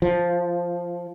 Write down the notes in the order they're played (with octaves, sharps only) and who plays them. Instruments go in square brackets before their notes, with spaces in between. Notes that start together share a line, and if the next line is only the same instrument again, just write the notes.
[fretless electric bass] F3